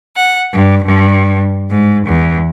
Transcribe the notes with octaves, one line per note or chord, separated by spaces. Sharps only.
F#5
G2
G2
G#2
E2